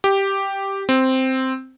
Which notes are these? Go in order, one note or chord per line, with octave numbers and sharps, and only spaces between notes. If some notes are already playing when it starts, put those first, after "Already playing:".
G4
C4